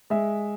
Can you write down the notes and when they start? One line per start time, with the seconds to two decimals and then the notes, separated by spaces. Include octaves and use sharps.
0.10 G#3 E5